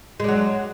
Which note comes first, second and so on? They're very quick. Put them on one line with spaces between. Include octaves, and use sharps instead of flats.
G#3 D4 F#3